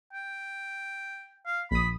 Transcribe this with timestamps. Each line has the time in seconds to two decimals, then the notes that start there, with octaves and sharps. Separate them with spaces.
0.13 G5
1.46 F5
1.71 A#1 B5 D#6